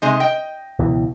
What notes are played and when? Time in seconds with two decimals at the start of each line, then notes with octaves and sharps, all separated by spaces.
0.02 C3 G#3 D#4
0.20 D#5 G5
0.79 C#2 B2 E3